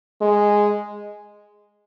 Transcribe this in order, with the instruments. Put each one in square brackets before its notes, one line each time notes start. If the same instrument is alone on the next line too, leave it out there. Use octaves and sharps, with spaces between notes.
[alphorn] G#3